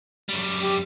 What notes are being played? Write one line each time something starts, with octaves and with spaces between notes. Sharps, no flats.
F#2 G3
G4